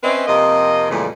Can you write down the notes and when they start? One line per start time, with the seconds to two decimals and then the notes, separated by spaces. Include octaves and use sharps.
0.03 C4 C#4 B4 C5 D#5 E5
0.27 F2 C3 A#3 D#5
0.90 F2 A#2 C#3 E3 G3 A3